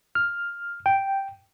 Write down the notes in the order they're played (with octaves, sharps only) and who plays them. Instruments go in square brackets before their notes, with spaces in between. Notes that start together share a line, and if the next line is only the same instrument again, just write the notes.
[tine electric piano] F6
G5